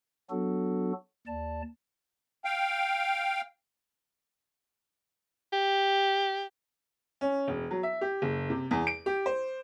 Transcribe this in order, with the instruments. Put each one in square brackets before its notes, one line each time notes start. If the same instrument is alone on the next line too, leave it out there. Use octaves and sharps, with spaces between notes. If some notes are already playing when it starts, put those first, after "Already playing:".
[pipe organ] F#3 B3 D4 F#4 A4
D#2 D5 A5
[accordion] F5 G5
[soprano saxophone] G4
[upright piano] C#4
E1
F#3
E5
G4
F#1
C3
E2
D7
G4
C5